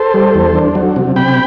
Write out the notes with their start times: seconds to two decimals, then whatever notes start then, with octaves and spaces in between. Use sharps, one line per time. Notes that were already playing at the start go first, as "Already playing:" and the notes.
Already playing: A4 C5
0.14 G3
0.34 E2
0.55 D4
0.75 F#3
0.96 C3
1.16 C3 G5 B5